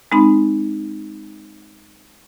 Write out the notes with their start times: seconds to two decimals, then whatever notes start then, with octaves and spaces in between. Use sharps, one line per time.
0.12 G#3 C4 D#4 B5